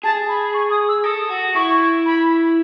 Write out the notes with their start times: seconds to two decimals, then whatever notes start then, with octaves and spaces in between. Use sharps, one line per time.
0.03 G#4 A5
0.28 B5
0.53 C#6
0.70 D#6
0.88 E6
1.04 A4 D#6
1.29 F#4
1.55 E4 C#6
2.05 B5